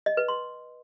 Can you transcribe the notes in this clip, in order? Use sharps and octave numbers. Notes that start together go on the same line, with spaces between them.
D#5
B4
C6